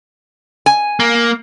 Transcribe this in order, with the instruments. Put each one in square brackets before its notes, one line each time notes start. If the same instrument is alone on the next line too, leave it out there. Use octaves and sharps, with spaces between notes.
[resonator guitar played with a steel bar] G#5
[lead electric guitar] A#3